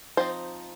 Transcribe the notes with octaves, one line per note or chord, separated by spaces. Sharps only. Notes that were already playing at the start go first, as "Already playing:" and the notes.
F3 C4 D#4 C5